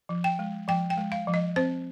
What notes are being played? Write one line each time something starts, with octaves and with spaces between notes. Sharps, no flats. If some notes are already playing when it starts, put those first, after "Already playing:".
F3
G5
G#3
F3 G5
G5
G#3
F5
F3
D#5
C4 C5